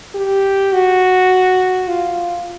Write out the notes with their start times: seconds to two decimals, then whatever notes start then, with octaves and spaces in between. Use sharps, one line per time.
0.15 G4
0.73 F#4
1.88 F4